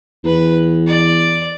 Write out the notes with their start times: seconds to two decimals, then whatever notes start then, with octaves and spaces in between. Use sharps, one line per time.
0.24 E2 B4
0.87 D5